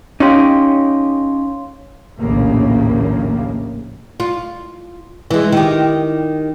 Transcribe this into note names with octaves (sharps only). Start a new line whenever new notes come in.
C#4 D#4 G4 C#5 F5 C6
A#1 D#2 A2 C#3 A#3
F4
E3 G#3
D#3 G4